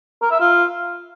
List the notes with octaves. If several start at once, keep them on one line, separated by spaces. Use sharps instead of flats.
A#4
E5
F4